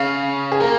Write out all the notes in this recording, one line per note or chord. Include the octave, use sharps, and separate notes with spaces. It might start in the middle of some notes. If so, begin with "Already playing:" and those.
Already playing: C#3 F5
G#4
A#3 A#4